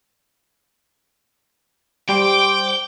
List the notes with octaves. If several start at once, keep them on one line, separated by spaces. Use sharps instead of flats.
G3 G4 C5 G5 D6